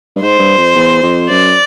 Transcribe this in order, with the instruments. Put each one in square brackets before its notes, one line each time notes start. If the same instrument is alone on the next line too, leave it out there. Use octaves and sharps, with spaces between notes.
[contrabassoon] G2
[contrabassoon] G#2 [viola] C5
[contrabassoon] G2
F2
E2
F2
[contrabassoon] F#2 [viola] D5